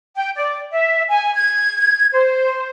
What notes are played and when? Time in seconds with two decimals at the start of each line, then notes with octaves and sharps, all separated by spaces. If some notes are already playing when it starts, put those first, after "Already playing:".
0.17 G5
0.36 D5
0.72 E5
1.09 G#5
1.35 G#6
2.12 C5